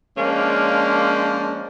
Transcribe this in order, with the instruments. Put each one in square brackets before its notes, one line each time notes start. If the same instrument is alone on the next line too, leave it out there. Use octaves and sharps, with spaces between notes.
[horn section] F3 G#3 A#3 C#4 D4